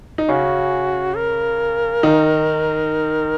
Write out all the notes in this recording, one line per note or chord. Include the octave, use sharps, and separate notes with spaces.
D#4
C#3 C#4 F#4
A#4
D#3 D#4